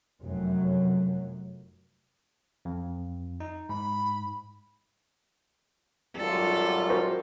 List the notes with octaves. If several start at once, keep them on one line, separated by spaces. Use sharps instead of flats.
F1 F#2 F#3
F2
D#4
G#2 B5
G#1 F#2 G3 F4 A4
F#4 A#4 C5